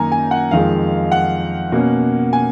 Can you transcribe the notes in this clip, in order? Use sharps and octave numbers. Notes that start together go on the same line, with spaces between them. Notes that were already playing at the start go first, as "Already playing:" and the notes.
Already playing: F#2 D#3 A#3 D#4 G#5 A#5
G#5
F#5
F2 D#3 G#3 F5
F#5
B2 A#3 C#4
G#5